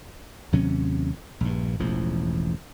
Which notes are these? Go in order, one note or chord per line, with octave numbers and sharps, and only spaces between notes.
D#2 C3 F#3 C#4
A#1 G2
E1 A1 E2 F3